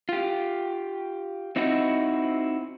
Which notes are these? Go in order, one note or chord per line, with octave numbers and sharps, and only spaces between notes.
F4 G4
C4 D#4 E4 F#4